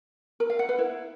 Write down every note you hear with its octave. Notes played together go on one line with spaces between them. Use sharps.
A#4
F5
F#5
B4
E4